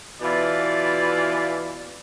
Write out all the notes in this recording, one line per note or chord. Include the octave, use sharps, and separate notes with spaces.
B2 E3 E4 F4 D5